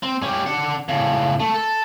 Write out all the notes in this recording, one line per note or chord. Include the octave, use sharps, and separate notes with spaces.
C4
C#4 G4
D4 F#5
A2 C#3
A3
A4